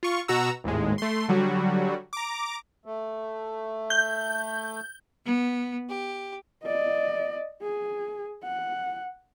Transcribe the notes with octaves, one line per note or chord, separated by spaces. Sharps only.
F4 C#6
B2 F#4 A#5 E6
G#1 D#2 A2 G#3
A3 C6
D3 F#3 G3 F#4
A#5 D6
A3
G6
B3
G4
D5 D#5
G#4
F#5